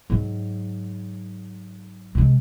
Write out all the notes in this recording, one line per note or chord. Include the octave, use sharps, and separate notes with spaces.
G#2 F#3
C3 G#3